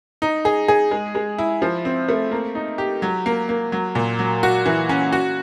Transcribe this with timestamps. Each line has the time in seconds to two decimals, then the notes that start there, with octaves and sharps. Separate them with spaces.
0.22 D#4
0.45 G#4
0.68 G#4
0.91 G#3
1.15 G#3
1.38 E4
1.62 F3
1.85 C4
2.09 A3
2.31 A#3
2.55 D#4
2.78 G4
3.02 F#3
3.26 A#3
3.49 A#3
3.72 F#3
3.95 A#2
4.19 F#3
4.43 F#4
4.66 E3
4.89 C#4
5.13 F#4